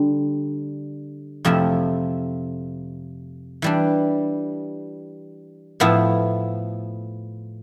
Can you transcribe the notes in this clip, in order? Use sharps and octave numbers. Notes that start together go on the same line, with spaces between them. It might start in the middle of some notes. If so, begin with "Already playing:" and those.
Already playing: D3 G3 D4
F2 C3 F3 A3 E4
E3 G3 D4
A2 F3 B3 E4